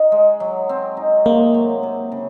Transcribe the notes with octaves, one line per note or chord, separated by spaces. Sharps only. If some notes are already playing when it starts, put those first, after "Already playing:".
Already playing: D#4
G#3
F#3
C4
D#4
C3 A#3
F#3
C3
C#3